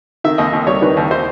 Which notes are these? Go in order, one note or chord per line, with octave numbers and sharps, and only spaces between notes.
D#3 E5
D#2 D#5
D#2
G3 C#5
D#3 B4
D#2
C5